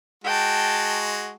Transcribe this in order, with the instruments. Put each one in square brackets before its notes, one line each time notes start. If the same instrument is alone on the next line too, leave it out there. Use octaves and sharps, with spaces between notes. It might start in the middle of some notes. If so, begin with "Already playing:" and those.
[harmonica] G#3 F#4 [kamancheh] G5 A5